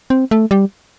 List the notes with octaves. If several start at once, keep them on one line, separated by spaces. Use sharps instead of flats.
C4
A3
G3